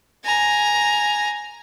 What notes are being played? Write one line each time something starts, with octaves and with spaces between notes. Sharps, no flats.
G#5 A#5